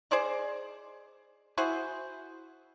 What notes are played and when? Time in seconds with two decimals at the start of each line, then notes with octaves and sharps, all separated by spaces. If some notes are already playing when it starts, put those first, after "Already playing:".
0.11 G#4 C5 D5 D#5
1.58 E4 F#4 G#4 C5